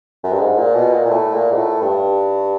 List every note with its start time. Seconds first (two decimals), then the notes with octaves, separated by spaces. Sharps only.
0.24 F#2
0.32 G2
0.39 G#2
0.57 A#2
0.75 B2
0.93 A#2
1.05 A#2
1.10 A2
1.33 A#2
1.52 G#2
1.57 A2
1.81 G2